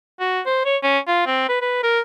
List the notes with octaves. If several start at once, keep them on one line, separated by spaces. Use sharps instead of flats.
F#4
C5
C#5
C#4
F4
C4
B4
B4
A#4